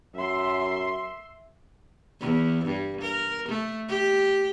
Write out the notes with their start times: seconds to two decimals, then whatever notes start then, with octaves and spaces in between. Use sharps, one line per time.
0.15 F#2 E5 C6
2.21 E2
2.65 G2
3.01 A#4
3.48 A3
3.88 G4